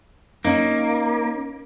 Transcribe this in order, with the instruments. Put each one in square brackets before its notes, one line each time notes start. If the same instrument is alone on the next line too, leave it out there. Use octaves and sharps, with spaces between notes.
[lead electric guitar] A#3 [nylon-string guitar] C#4 D#4